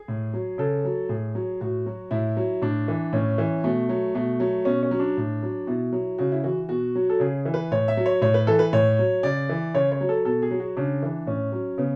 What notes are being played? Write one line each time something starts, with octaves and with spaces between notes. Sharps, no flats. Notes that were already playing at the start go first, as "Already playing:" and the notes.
Already playing: G#4
A2
F#3
C#3 A4
F#3
A2 G#4
F#3
A2 F#4
F#3
A2 E4
F#3
A2 D4
E3
A2 C#4
E3
B2 A3
F#3
B2 A3
F#3
B2 C#4
C#4
F#3
D4
A2
F#3
B2 E4
F#3
C#3 F#4
E4
E3 F#4
B2 F#4
F#3
A4
C#3 G#4
E3
B4
A2 C#5
E5
F#3
C#5
A2 C#5
B4
E3 A4
B4
A2 C#5
F#3
C#3 D5
E3
C#3 C#5
C#5
F#3
A4
B2 A4
G#4
F#3
F#4
C#3 D4
E3
A2 C#4
F#3
C#3 B3